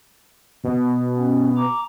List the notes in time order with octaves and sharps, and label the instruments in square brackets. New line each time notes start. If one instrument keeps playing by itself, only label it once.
[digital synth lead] B2
[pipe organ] C#4
A#5 D6